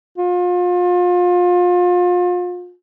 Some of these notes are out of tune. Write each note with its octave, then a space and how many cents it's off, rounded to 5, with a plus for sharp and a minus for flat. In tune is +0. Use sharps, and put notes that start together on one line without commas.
F4 +30